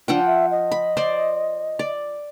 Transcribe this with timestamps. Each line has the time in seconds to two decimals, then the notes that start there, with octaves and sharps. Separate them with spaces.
0.08 F3 D4 F#5 G5
0.27 E5
0.51 D#5
0.71 B5
0.97 C5 D5 C6
1.79 D5